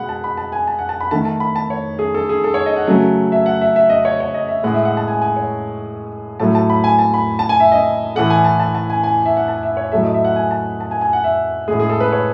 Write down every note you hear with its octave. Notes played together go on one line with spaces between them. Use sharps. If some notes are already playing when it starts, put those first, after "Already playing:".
Already playing: B2 G#3 F#5 B5
A5
B5
A5
G#5
A5
F#5
A5
B5
D#3 A3 A5
A5
B5
A5
C#5
G#4
A4
G#4
A4
C#5
D#5
F#5
C#3 F#3 A3
E5
F#5
E5
E5
D#5
C#5
C#5
D#5
E5
A2 G#3 F#5
E5
F#5
A5
G#5
G#5
C#5
A2 F#3 A3 A5
A5
B5
G#5
A5
B5
A5
G#5
E5
D#5
A2 E3 A3 F#5
G#5
A5
A5
A5
G#5
G#5
E5
F#5
A5
E5
C#5
A2 F#3 A3 E5
D#5
E5
F#5
G#5
A5
A5
G#5
G#5
F#5
E5
A2 G#3 G#4
G#4
A4
B4
C#5